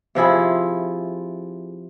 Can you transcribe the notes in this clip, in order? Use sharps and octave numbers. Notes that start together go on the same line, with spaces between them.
C3 F3 E4 G#4